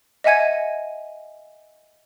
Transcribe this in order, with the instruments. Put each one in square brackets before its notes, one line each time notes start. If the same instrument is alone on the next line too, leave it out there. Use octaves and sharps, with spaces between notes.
[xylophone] D#5 E5 F#5 G#5 G#6 D#7